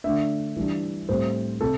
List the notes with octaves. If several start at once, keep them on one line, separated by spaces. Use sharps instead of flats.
D3 A3 D4 E5
E3 G3 D4
A2 G3 C4 C5
C3 A4